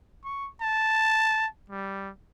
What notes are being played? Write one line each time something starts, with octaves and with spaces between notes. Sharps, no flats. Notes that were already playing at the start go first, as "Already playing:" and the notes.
C#6
A5
G3